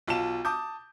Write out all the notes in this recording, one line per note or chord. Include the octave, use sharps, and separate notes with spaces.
B1 F4 A5 E7
A5 D6 D#6 G6